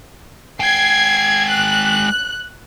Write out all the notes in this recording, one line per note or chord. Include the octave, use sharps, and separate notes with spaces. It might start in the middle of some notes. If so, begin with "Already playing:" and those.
G#3 G5 G#6 C7
F#6